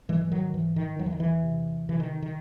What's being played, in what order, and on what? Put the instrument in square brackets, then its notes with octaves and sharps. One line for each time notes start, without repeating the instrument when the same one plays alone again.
[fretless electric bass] G#2 E3 G#3
E3
D#3 F#3
G#2 E3
D#3
E2 F#3
E3
D#3
E3
C3
C3 E3
D#3
D#3